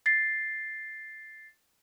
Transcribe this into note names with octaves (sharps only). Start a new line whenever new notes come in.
A6 C7